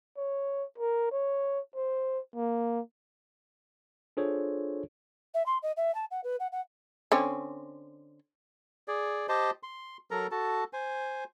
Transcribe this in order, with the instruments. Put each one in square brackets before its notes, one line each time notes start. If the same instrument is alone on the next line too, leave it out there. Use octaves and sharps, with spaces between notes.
[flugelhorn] C#5
A#4
C#5
C5
A#3
[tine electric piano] D4 F4 G#4 A4 C5 C#5
[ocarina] E5
C6
D#5
E5
A5
F#5
B4
F#5
F#5
[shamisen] D3 C4 C#4
[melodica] G#4 D5
G4 C5 D#5 A5
C6
F#3 A4 A#4 A#5
F#4 A4 A5
C5 G#5